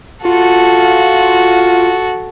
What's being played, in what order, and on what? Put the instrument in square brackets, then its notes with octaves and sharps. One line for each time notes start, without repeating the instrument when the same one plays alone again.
[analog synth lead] F4 [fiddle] F#4 A4